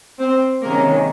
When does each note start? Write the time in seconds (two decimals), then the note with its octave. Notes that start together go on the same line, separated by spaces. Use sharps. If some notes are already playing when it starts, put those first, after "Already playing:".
0.19 C4 C5
0.62 C3 D#3 G#3 A#3 C#4 A#4